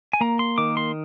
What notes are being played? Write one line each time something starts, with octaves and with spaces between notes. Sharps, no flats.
G#5
A#3 A#5
C6
D#3 D6
C6